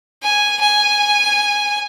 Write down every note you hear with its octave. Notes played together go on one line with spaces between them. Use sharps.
G#5
G#5